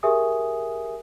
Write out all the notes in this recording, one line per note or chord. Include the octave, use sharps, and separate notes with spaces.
G4 G#4 A#4 E5 G#5 D#6